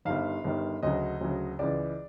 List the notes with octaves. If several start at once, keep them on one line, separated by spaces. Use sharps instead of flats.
G1 G2 D#3 F5
G1 G2 D#3
D2 C#3 F#3 D#5
D2 C#3 F#3
C#2 C#3 E3 D5